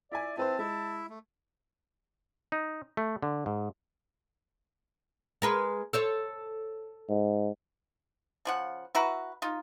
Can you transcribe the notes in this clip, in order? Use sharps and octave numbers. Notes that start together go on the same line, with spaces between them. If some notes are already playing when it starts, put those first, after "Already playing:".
E4 D5 E5 G#5
C4 E4 B4 C5 A5
G#3 E4 E5
A3
D#4
A3
D3
G#2
G#3 A#4 B4
A4 C5 C#5
G#2
C#3 F3 F#5
E4 F#4 B4 A#5
D#4 F4